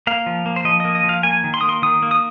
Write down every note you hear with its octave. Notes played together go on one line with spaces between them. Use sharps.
A#3 F5
F3
A#3
C5
F3 D#5
A#3 D#5
D#5
F3
F5
A#3 G#5
D#3
C6
A#3 D#6
C6
D#3 D#6
A#3
D#6